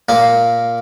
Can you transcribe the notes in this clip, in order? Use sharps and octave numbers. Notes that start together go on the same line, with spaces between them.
A#2 A#3